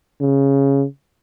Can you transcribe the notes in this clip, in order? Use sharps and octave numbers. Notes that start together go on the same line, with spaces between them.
C#3